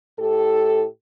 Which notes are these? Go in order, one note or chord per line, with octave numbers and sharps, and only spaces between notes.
A2 E4 G4 A4